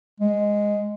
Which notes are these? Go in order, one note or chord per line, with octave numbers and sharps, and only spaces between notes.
G#3